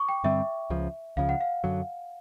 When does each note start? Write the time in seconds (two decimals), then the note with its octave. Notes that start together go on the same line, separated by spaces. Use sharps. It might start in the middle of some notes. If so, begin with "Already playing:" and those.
Already playing: C#6 D6
0.09 G5
0.24 G2 D3 G3 C4 E5
0.70 C#2 C#3 F3
1.17 C#2 C#3 F3 F5
1.29 F#5
1.41 F5
1.64 F#2 D3 F#3